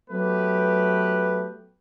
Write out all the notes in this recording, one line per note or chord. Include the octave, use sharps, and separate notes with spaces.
F#3 A3 B3 G4 B4